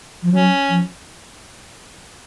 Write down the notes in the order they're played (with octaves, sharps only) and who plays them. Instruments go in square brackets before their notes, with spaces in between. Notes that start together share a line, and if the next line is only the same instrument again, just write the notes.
[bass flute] F3
[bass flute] F#3 [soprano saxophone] C#4
[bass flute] F3